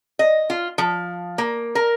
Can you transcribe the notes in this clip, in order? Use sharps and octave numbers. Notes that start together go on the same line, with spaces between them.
D#5
F4
F3
A#3
A#4